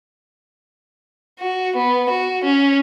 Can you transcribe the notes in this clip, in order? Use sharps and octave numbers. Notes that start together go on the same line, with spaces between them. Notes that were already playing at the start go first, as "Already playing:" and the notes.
F#4
B3
F#4
C#4